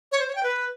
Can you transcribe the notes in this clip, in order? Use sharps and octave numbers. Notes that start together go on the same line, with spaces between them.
C#5
C5
C#5
G5
B4